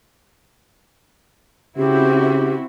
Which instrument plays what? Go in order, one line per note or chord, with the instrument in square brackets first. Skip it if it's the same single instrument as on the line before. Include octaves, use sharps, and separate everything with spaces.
[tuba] C#3 [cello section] C4 E4 F#4 [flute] G4